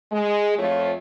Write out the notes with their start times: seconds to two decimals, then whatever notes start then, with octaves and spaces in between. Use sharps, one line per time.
0.11 G#3
0.57 F2 F3 A3 F4 C#5